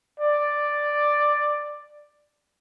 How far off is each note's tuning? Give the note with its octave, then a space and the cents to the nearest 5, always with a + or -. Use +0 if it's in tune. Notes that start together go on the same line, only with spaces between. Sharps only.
D5 +5